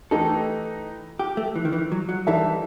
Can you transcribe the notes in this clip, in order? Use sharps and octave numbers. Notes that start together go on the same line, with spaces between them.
E3 A3 D#4 G4 A4
G4
A3
E3
D#3
E3
F#3
F#3
E3 G3 D#4 A4 E5